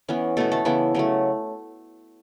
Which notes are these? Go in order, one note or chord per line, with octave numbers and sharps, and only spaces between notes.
E3 B3 C#4
B2 A3 B3 A4
A3 A4
C#3 E3 B3 E4
C#3 F#3 A3